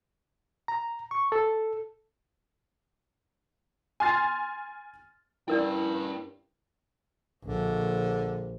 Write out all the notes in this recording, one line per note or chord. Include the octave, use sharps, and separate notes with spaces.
A#5
C#6
A4
G#5 C6 F6 A6
G2 C#4 E4 A#4 D5 G5
A#1 D3